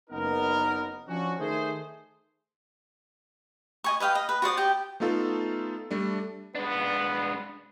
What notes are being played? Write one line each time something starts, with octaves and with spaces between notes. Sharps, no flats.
F#1 B3 D#4 A#4
F3 C#4 D4 F#4
D#3 A3 G#4 C5
D#5 G#5 C#6
B4 D#5 F5 G5
D#5
B4
F#4 C5 D5 D#6
G4 G5
A3 B3 D#4 F4 A4
G3 A3 D4
G#3 B3 D4